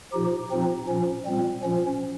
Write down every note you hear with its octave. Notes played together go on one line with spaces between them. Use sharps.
A#2 F3 D#4 G4
A#2 F3 C4 D#4
A#2 F3 C#4
A#2 G3 C4
A#2 F3 C#4